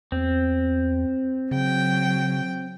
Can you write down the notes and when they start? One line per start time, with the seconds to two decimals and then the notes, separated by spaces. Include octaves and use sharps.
0.12 E2 C4
1.51 C#3 F#3 G5